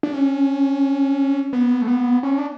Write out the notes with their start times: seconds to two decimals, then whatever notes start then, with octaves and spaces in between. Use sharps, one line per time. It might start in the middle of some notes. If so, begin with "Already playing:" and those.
0.03 D4
0.14 C#4
1.53 B3
1.82 A3
1.87 B3
2.23 C#4
2.38 D4